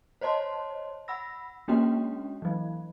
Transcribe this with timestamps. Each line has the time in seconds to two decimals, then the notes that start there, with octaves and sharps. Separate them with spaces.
0.21 C5 C#5 D#5 A5 C6
1.08 F#5 B5 E6 A#6
1.68 G#3 A#3 C#4 D4 F#4 G5
2.42 E3 F#3